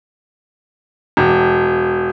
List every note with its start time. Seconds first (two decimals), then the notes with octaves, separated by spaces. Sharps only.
1.17 E1